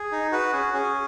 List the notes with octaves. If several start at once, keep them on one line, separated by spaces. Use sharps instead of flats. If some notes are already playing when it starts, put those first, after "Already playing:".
Already playing: G#4
D#4
F#4 B4
C#4 G#4
C#4 G#4